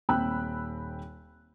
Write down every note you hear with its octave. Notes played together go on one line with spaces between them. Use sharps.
D#1 C4 G5 B5 E6 F#6